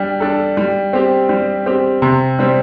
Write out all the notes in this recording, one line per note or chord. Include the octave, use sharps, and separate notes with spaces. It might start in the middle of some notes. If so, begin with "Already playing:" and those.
Already playing: G3 D4
D4 A4
G3
C4 G4
G3
C4 G4
C3
G3 C4